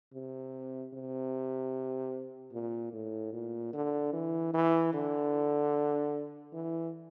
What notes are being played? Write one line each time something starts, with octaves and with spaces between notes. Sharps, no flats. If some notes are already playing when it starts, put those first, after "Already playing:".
C3
C3
A#2
A2
A#2
D3
E3
E3
D3
E3